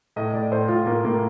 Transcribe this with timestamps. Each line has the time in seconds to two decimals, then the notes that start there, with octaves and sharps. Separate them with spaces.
0.16 A2 D#5
0.33 A2 D5
0.51 A2 C5
0.68 A2 F4
0.86 A2 A#3
1.04 A2 A#3